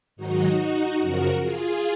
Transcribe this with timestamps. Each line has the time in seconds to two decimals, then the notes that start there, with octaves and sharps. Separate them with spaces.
0.16 G#2 D#3 F#3 D#4 F#4
0.57 D#4 F#4
0.99 F#2 C#3 F3 F#4 A#4
1.40 F4 G#4